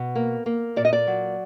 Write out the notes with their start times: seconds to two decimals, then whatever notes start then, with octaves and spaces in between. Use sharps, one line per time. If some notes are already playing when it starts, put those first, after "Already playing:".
Already playing: B2
0.15 A#3
0.46 A#3
0.76 A#2 D5
0.85 D#5
0.93 D5
1.07 F#3